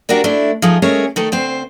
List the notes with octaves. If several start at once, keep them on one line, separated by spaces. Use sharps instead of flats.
D4 F#4 G4 A#4 D5
A3 D4 E4
F3 G#3 A3 D#4 G#4
G#3 A3 C#4 G#4 A#4 C#5
D#3 A3 A4
D2 C4 C5